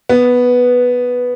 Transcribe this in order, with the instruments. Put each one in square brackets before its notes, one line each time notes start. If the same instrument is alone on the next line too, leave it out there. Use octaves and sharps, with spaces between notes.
[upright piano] B3